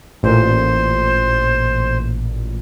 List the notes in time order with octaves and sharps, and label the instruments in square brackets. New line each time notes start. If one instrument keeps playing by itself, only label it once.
[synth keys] A1 A#2 [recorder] C5